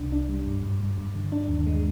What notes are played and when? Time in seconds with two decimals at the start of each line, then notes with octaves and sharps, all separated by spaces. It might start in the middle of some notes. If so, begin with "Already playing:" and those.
Already playing: C2 D4
0.12 D4
0.29 G3
0.46 G2
0.63 G2
0.80 G2
0.98 G2
1.15 D3
1.32 D4
1.48 D#2
1.67 G#3